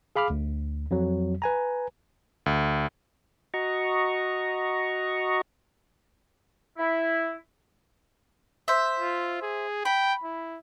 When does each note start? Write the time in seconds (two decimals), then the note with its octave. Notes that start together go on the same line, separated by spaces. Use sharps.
0.16 G#4 F5 B5 D6 F6
0.30 D2
0.91 F2 F#3
1.42 B4 G#5 A#5
2.46 D2
3.54 F#4 D#5 A#5 C#6
6.77 E4
8.68 C5 E5
9.00 F4
9.42 G#4
9.85 G5 B5
10.24 E4